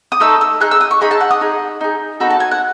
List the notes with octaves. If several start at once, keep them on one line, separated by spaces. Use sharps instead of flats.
D#6
A3 D#4 A4 E6
E6
D#4 G#4 F#6
E6
D#6
C#6
D#4 G#4 B5
A5
F#5
D#6
D#4 G#4
D#4 G#4
B3 D#4 F#4 A4 B5
A5
G#5
F#5